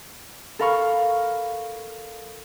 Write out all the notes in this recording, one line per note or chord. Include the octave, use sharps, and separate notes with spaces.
A4 A#4 F5 B5 C#6 F6